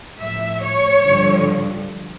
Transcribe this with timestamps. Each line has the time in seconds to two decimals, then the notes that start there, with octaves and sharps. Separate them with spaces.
0.19 A2 F3 E5
0.62 C#5
1.05 G2 D3 F3